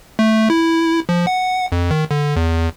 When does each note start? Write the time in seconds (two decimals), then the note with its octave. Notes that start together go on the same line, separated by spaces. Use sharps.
0.19 A3
0.50 E4
1.09 F3
1.27 F#5
1.72 F2
1.91 D#3
2.11 D3
2.36 E2